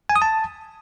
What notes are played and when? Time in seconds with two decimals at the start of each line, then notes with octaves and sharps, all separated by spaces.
0.09 G#5
0.16 D#6
0.22 A5